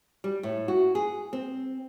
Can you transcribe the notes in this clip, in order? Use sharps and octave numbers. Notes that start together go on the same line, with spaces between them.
G3
A2
F#4
G#4
C4